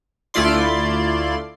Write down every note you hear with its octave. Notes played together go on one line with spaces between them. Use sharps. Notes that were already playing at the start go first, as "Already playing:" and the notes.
D2 A3 E4 F4 D5 C6